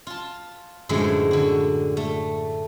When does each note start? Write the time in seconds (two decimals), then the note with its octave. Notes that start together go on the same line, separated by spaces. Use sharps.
0.07 F4 A5
0.89 F#2 A2 D3 E3 F3 G#3
1.31 D3 F#4
1.97 A3